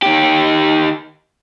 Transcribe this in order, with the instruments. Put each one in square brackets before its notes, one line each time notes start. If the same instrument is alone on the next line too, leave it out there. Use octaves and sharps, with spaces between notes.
[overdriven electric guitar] D#3 G4